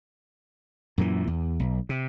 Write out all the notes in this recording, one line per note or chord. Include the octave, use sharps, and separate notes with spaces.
F#2 A#2 D3 E3
E2
B1
C3